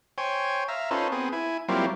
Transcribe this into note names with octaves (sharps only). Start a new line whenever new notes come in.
C5 C#5 G5 G#5
E5 F5 A#5
C#4 D#4 F4 A4 B4 C5
B3 C4 G#4
E4 G#5
F#3 G3 A#3 C4 E4 F4